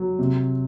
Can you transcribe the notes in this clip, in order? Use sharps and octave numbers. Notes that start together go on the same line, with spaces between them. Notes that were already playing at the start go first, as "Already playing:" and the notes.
Already playing: F#3
C3